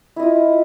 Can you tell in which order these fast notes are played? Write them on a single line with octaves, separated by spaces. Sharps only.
E4 D#5 F4